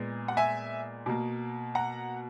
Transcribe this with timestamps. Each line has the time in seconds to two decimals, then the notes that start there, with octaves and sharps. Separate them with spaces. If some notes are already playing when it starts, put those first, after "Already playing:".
Already playing: A#2 G#3 B3
0.28 F#5
0.37 E5 G#5
1.06 B2 A#3
1.75 F#5 A#5